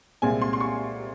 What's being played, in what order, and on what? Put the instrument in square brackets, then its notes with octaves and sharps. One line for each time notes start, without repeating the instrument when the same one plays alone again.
[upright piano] C2 A#2 G#3 C4 G#5
C6
C6
C#6